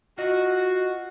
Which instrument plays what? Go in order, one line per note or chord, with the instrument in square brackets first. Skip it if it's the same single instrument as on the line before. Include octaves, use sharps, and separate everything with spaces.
[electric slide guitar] F4 D#5 [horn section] F#4